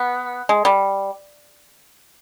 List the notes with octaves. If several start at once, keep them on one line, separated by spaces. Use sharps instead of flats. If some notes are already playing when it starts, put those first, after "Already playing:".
Already playing: B3
G#3
G3